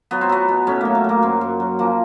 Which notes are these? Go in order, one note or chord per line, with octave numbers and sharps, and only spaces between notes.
F#3 B3
C4
F#3 B3
B2
A2 C#4
F#3 A#3
A3
F#3 A#3
F#2 C4
F#2
F#3
F3 A#3